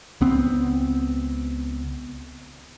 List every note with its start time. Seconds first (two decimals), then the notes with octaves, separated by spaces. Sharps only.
0.21 C#2 B3 C4